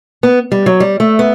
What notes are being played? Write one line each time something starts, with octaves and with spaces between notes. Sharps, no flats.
B3
G3
F#3
G3
A3
B3